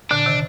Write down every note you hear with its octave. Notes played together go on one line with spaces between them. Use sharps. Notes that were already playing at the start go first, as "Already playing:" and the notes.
A#2 D3 D4
C3 D#3